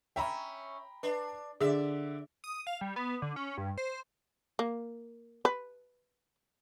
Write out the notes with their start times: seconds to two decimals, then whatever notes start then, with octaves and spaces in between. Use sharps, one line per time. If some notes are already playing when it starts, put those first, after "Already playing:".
0.16 C#4 E5 G5 A#5 B5
1.03 D4 B4
1.61 D3 G#4 D5 E5
2.44 D#6
2.67 F5
2.81 G3
2.96 B3
3.22 D3
3.36 C#4
3.57 G2
3.78 C5
4.59 A#3
5.45 B4